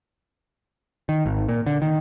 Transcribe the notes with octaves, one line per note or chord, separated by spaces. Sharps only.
D#3
G#1
A#2
D3
D#3